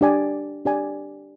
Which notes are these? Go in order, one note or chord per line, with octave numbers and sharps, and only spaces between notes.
D4 G4 D5 G#5
D4 G4 D5 G#5